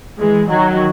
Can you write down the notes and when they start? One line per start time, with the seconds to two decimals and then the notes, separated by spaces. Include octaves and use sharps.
0.19 E3 G#3
0.50 D#3 F#3